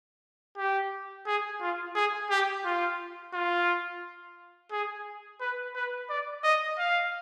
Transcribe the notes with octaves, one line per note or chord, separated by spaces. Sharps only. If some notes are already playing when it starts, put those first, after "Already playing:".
G4
G#4
F4
G#4
G4
F4
F4
G#4
B4
B4
D5
D#5
F5